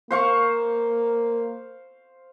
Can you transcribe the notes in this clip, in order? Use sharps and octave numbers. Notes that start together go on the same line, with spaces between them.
A#3 C5 F5 C#6